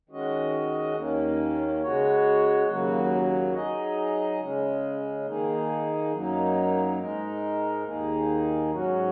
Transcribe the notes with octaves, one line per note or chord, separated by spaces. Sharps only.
D#3 G#3 C#4 F#4 D#5
D#2 D#3 A#3 C#4
C#3 G#3 F#4 C#5
D#2 C#3 F#3 A#3 F#4
F#3 D#4 G#4 D#5
C#3 G#3 C#4
D#3 A#3 D#4 G#4
F#2 F#3 A#3 D#4
G#2 G#3 D#4 A#4
D#2 D#3 A#3 D#4 G#4
G#2 F#3 C#4 F#4